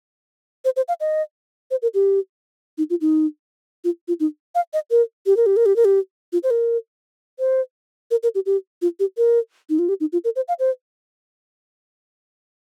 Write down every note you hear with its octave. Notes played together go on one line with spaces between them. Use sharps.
C5
C5
F5
D#5
C5
A#4
G4
D#4
F4
D#4
F4
F4
D#4
F5
D#5
A#4
G4
A#4
G4
A#4
G4
A#4
G4
F4
C5
A#4
C5
A#4
A#4
G4
G4
F4
G4
A#4
D#4
F4
G4
D#4
F4
A#4
C5
F5
C5